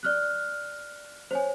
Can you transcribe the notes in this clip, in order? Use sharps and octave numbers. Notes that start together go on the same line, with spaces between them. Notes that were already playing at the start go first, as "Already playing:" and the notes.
D5 F6 F#6
C5 C#5 G#5